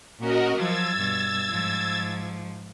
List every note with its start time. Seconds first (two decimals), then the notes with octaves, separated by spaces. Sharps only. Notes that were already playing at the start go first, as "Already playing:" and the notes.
0.20 A#2 C#4 F#4 A#4 D#5
0.56 F3 F#3 E6 G#6 A6
0.97 G2 B2
1.50 G#2 F3